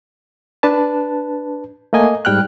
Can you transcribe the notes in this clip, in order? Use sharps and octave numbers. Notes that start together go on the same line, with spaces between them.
D4 B4 A5
A3 A#3 D#5 G#5
G#2 G3 G5 F6 F#6